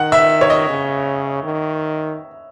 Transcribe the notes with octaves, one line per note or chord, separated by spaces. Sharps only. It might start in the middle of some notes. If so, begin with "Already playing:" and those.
Already playing: D#3 F#5
E5
C#5
D#5
C#3
D#3